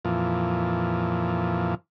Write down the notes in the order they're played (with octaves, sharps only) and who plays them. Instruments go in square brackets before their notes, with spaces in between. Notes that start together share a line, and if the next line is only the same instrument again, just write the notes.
[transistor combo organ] F2 A#2 E3 F3